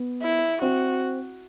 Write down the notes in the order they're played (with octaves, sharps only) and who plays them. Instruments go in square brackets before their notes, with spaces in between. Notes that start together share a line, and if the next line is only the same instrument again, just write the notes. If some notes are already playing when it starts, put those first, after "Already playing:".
Already playing: [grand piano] B3
[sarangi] E4
[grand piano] C4 [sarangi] F#4